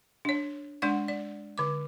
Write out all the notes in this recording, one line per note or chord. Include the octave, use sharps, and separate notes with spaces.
D4 C#5
G#3 D4 D5 F#5 C#6
D5
D3 D6